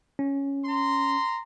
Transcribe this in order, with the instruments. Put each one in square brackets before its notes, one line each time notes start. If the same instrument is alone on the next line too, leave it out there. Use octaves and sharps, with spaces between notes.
[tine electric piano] C#4
[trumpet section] A#5 C6